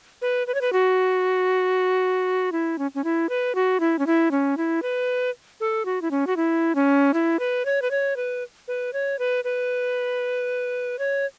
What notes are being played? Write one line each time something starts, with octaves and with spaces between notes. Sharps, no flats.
B4
B4
C#5
B4
F#4
E4
C#4
C#4
E4
B4
F#4
E4
C#4
E4
C#4
E4
B4
A4
F#4
E4
C#4
F#4
E4
C#4
E4
B4
C#5
B4
C#5
B4
B4
C#5
B4
B4
C#5